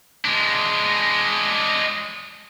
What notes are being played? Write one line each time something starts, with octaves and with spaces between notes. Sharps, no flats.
G#3 D4